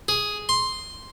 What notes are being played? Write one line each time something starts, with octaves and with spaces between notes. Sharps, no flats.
G#4
C6